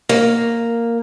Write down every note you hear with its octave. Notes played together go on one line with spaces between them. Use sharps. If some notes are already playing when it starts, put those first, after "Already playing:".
A#3